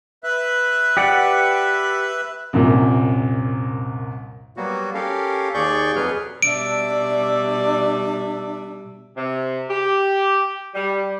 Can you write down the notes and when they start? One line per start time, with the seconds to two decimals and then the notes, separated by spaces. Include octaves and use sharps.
0.24 B4 E5 F#6
0.97 G4 D5 F#5
2.53 C2 F#2 A#2
4.57 F#3 G3 A#3 B3 F#4
4.94 C#4 G4 A4 A#4 F5
5.54 D#2 G#4 D5 C#6 G6
5.96 F2 B2 F#3 G#4 B4 F6
6.42 B2 G3 D4 D5 E5 D7
9.16 C3
9.70 G4
10.74 G3